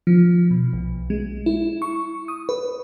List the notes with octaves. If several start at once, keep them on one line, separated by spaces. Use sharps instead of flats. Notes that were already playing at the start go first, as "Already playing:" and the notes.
F3
B2
B1
G#3
E4
C#6
D#6
B4